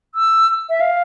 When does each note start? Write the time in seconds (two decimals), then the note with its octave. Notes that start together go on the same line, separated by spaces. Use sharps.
0.15 E6
0.69 E5
0.81 F5